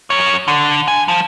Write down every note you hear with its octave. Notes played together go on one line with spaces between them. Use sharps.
F#2 C#5
D3
G#5
F3